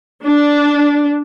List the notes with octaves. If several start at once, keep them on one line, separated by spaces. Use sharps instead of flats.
D4